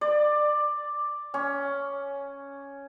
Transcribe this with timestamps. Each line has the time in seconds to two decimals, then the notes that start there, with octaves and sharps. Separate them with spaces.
0.01 D5
1.34 C#4